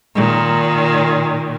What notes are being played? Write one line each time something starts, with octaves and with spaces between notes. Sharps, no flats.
A#2 D#3